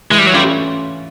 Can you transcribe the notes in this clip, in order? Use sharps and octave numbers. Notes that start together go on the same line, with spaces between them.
E3 G#3
G3
F#3
G3 A3 C#4 F4